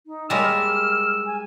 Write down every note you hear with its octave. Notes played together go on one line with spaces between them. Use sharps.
D#4
G3 G#3 A#3 C#5 E6
F6
G#5